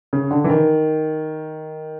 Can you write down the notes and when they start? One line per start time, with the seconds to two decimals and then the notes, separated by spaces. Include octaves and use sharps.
0.13 C#3
0.31 D3
0.44 E3
0.49 D#3